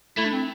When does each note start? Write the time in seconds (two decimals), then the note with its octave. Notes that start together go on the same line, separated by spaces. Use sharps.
0.17 A3 E4
0.26 D4
0.33 C4